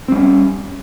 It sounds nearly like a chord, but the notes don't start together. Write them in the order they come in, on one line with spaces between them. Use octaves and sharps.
C4 G3 C#4